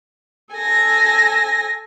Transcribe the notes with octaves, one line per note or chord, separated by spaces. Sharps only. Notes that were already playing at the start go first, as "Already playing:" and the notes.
A4 G#5 A#6